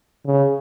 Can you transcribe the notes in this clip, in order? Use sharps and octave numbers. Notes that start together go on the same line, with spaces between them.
C#3